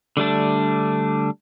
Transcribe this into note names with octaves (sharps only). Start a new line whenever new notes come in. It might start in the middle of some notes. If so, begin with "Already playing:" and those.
D3 G3 A3 D4